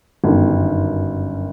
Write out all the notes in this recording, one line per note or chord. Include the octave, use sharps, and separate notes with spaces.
G1 F#2 D#3